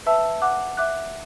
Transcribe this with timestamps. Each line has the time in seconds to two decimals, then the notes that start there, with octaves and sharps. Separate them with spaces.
0.06 B4 E5 A5 E6
0.42 F#5 D6 F#6
0.77 E5 D6 F#6